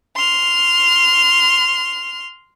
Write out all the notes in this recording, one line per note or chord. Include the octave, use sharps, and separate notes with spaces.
C6 F6